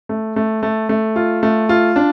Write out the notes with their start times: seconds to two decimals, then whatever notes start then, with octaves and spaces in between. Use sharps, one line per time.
0.09 A3
0.36 A3
0.63 A3
0.89 A3
1.16 F4
1.43 A3
1.69 F4
1.96 D4